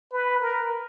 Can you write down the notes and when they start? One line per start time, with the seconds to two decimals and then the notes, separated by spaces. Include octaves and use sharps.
0.12 B4
0.42 A#4